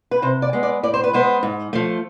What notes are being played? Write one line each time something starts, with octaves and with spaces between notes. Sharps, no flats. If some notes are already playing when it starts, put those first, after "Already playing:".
B4
C3 C5
D5
G#3 B3
D5
A2 D5
C5
B4
G#3 B3 C5
G#2
F3 A3